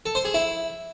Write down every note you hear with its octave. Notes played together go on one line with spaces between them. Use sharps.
A4
C5
G#4
E4